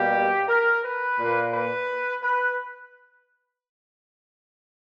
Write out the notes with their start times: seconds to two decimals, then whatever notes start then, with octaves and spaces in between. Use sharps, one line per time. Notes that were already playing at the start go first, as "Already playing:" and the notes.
Already playing: B2 G3 A#3 G4
0.48 A#4
0.83 B4
1.18 A#2 A#3
1.53 B4
2.22 B4